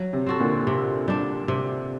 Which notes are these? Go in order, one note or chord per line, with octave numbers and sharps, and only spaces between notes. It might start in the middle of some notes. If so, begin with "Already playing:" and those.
Already playing: F#3
C3
C4 F#4 A4
A#2 D3
C3
G3 D4
C3